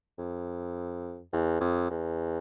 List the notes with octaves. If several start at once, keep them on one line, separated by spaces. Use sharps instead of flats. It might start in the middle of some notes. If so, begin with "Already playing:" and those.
F2
E2
F2
E2